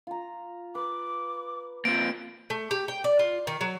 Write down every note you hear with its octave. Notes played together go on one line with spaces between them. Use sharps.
F4 A#5
B4 D6
A#3 C4 F4 D7
A3
G4
G5
D5
F4
D#3
F#3